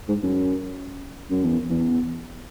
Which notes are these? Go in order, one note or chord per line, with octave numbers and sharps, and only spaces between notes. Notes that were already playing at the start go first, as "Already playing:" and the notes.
G#2
F#2
F#2
E2
E2